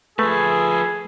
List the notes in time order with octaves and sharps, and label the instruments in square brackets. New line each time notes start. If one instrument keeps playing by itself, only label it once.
[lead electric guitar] F3 B4 [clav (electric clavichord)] A3 [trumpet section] G#4